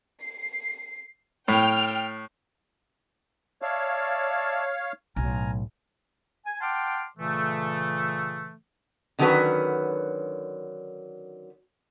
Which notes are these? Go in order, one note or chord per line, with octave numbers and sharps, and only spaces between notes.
C7
A2 G5 F6
C#5 D5 E5 F5 A5
B1 A2 G#5 A#5 F6
G#5
F#5 G5 A5 C6 D6 F6
A#2 C#3 E3 A3
D3 D#3 F#3 C#4 F#4 B4